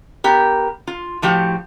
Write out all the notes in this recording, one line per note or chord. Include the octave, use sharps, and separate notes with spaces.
B3 G4 A#4
F4
A2 F3 F#4 G4